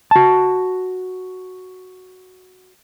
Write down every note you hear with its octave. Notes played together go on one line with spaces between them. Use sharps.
F#4 A5